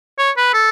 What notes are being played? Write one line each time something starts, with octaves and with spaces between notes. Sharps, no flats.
C#5
B4
A4